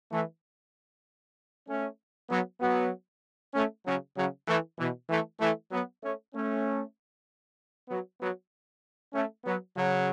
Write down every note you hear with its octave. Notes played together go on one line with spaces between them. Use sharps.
E3 A3
A3 C#4
F#3 B3
F#3 B3
A3 C#4
C#3 F#3
C#3 F#3
E3 A3
B2 E3
E3 A3
E3 A3
F#3 B3
A3 C#4
A3 C#4
F#3 B3
F#3 B3
A3 C#4
F#3 B3
C#3 F#3